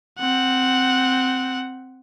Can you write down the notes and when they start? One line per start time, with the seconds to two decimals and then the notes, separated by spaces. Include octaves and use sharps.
0.19 C4 F#5